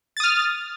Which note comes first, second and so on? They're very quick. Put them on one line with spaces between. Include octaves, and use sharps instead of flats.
A6 D#6 F6